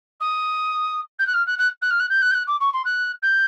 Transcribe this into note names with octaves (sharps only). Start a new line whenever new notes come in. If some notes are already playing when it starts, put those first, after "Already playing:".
D#6
G6
F#6
F6
F#6
F#6
F#6
F6
F#6
G6
F#6
G6
F#6
D6
C#6
C6
F#6
G6